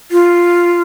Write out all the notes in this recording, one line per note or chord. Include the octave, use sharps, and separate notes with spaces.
F4